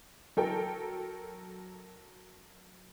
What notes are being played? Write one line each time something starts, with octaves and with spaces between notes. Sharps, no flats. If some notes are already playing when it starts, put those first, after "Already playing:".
F#3 A4 A#4 G5